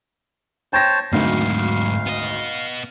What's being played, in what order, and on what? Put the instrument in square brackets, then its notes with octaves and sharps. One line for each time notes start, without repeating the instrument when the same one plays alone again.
[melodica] C5 C#5 A5 [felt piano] G5 A#6
[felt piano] G#1 D2 [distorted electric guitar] G#2 F#3 [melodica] F5
[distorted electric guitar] B3 D#5